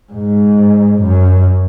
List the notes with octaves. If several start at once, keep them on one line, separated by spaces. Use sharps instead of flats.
G#2
F#2